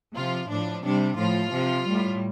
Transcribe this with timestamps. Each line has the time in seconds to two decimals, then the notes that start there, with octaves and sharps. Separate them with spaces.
0.15 C3 F3 F4
0.49 A2 F3 D4
0.83 C3 G3 D4
1.17 A2 F3 F4
1.51 C3 F3
1.85 A2 G3